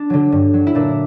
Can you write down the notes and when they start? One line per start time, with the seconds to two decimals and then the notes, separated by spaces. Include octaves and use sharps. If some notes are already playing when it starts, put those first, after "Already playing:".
Already playing: D4
0.10 D3 F#3
0.32 G2
0.54 F#3
0.67 E4
0.75 A#2 D4